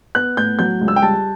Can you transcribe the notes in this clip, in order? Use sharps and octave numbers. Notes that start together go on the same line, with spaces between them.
B3 F#6
A2 G6
F#3 G6
C#2
E6
G5
G3 A5